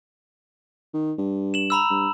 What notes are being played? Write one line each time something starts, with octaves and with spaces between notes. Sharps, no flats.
D#3
G2
E7 F#7
A#5 B5 E6
G2